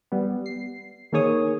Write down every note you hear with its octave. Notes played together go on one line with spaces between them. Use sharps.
G3 B3
C7
D#3 A#3 G#4 C#5 D#6